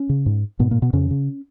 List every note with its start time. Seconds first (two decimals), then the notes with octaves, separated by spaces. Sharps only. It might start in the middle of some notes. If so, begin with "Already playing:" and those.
Already playing: C#4
0.09 C#3
0.26 G#2
0.59 G#2 B2 B3
0.71 A#2 A#3
0.82 B2 B3
0.93 F2 C#3 C#4
1.11 C#3